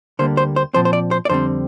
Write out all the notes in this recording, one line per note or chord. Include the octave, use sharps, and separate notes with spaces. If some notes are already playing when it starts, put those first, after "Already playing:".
D2 D3 G3 A#3 C5
C5
C5
A#2 F3 C4 C5
C5
D5
C5
D5
F2 D3 G3 C4 C5